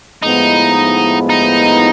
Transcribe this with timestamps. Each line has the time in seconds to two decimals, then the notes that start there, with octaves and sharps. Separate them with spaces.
0.22 A2 F3 G#3 B3 D#4 E4
1.29 D#4